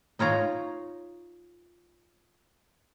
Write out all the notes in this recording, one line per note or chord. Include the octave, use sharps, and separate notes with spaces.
D#4 F4 C#5 A#5